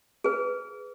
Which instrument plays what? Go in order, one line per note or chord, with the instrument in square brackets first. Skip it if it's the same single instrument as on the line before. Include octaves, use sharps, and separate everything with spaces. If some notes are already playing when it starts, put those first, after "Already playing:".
[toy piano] G#4 B4